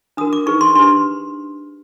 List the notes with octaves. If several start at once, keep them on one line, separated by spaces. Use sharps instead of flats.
D4 F#4 A#4 D#6
D6
D#4 G#4 B4 C#6
C6
D4 G4 B4 C6